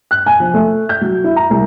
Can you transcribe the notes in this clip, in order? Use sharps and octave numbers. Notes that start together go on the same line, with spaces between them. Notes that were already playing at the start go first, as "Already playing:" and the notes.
F#6
G#5
F3
A3
G6
F#3
E4
A#5
C2